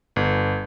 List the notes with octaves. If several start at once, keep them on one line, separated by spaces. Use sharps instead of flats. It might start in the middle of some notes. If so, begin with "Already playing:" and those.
G1